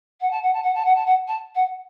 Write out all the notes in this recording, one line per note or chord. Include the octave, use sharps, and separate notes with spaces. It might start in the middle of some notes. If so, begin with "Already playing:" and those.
F#5
A5
F#5
A5
F#5
A5
F#5
A5
F#5
A5
F#5